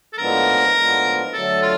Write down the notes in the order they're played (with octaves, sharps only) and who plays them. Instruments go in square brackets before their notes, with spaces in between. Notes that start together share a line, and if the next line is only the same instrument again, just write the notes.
[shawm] A4
[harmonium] A2 F3 G#3 B3 D4 [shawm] A#4
[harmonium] A2 F3 G#3 B3 D4
[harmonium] D3 F#3 A3 [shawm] A4
[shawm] F4